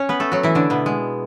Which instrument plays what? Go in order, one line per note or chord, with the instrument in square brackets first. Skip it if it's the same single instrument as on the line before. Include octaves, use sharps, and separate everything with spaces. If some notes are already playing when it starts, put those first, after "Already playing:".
Already playing: [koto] C#4 C#5
B3 B4
A3 A4
F#3 F#4
E3 E4
D3 D4
B2 B3
G#3